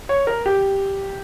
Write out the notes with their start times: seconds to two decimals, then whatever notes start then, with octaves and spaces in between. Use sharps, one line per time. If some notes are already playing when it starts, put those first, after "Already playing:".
0.09 C#5
0.27 A#4
0.46 G4